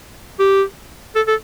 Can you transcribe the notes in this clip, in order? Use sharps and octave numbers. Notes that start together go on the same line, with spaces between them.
G4
A4
A4